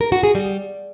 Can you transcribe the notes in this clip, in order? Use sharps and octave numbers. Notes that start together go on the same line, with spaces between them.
A#4
F#4
G#4
G3